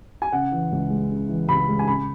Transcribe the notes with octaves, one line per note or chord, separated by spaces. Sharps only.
G#5
C#3 F#5
E3
C#2
G#3
C#3
E3
C#2 B5
G#3
G#5
C#3 B5